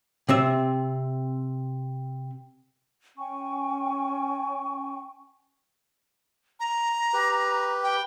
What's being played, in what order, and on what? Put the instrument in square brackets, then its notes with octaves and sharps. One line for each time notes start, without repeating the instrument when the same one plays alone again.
[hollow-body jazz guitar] C3 C4 E5
[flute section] C#4 G5 G#5 C#6
[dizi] A#5
[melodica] G4 B4
[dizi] G5